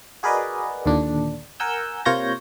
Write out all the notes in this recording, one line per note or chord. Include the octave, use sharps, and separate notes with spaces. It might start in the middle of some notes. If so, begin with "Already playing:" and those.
F#4 G#4 A#4 B4 D5 D#5
D#2 A#2 D3 D4
A#4 F#5 G#5 E6 G6
C3 A#3 F4 C#5 G6 A#6